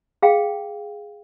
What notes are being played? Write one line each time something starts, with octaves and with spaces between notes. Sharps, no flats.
G#4 F5 G5